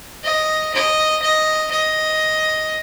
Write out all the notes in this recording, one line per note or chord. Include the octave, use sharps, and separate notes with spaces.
D#5
D#5
D#5
D#5